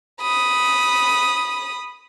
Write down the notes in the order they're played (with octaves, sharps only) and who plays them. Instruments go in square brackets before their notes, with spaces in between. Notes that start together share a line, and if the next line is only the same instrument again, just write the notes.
[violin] B5 D#6